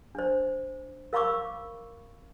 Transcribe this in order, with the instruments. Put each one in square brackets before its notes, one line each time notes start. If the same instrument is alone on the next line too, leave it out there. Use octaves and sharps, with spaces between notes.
[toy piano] D4 C5
A#4 F5 B5 C#6 D6 E6